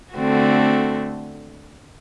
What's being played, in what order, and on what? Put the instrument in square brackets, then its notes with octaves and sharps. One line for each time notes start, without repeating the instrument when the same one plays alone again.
[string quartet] D3 A3 C4 F#4